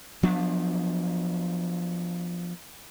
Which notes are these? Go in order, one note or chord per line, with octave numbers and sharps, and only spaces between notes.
F3 F#3 B3 D4